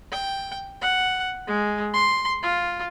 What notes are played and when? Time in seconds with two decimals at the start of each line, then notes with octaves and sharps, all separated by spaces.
0.11 G5
0.81 F#5
1.47 G#3
1.94 C6
2.42 F4